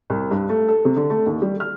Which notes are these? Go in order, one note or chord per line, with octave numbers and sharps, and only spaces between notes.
C2
G2
A3
A4
C3
D3
A3
D#2
G3
F6